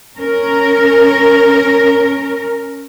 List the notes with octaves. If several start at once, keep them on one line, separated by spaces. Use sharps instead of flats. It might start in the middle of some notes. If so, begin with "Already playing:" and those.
C#4 A#4